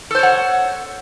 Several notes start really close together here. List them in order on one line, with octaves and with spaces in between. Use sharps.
A4 C5 C#5 F#5